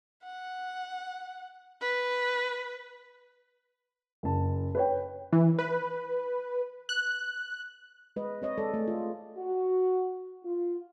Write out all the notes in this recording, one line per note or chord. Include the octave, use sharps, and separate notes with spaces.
F#5
B4
F#1 A5
B4 C#5 G5
E3
B4
F#6
G#3 B4 D#5
C4 C#5 D#5
G#3 A4 D5
A3 G#4
F4
F#4
F4